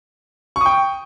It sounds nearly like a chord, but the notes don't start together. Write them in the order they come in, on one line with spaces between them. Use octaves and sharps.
C#6 D#6 G5